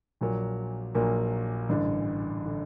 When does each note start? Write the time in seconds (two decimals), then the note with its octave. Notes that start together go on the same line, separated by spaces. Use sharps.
0.21 A#1 A#2 F#3 A#3
0.95 A#1 A#2 F#3 A#3
1.69 A1 G2 D3
2.46 D3